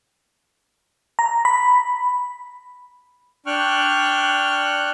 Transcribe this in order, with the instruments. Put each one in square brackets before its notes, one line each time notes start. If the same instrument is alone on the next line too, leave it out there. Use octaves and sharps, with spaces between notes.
[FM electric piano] A#5
B5
[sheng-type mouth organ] D4 G5 C#6 F6 F#6